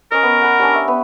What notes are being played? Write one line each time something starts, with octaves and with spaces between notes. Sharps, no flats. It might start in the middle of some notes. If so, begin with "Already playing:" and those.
C#4 A#4 D#5
B3
F#5 B5
G3 C#4 D4
E5 C#6
B3